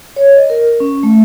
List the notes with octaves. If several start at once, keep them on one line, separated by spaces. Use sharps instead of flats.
C#5
D#5
A#4
C#4
A3